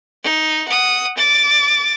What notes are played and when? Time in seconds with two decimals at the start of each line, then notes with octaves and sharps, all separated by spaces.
0.23 D#4
0.68 F#5 D#6
1.18 D6 A6